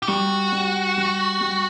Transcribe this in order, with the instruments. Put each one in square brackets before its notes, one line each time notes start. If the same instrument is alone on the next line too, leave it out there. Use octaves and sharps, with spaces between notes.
[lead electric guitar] G4
[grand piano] G3 [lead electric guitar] F#4
[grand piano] G3
G3
G3